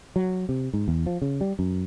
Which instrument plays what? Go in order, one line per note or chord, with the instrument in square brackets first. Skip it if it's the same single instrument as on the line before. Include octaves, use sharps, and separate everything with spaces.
[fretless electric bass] F#3
C3
G#2
E2
F3
C#3
G3
F#2